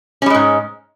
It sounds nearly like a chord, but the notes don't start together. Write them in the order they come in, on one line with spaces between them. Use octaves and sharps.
C#4 G3 G#3 G#2